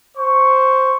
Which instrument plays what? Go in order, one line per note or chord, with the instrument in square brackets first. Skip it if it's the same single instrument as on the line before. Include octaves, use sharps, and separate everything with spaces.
[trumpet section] C5 C#6